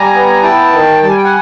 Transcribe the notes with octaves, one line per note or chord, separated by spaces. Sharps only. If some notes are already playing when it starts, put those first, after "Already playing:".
Already playing: G3 G#5 A#5
B3
E4 G5 A5
D#3
G3 A5
G#5
G5
F#5 G#5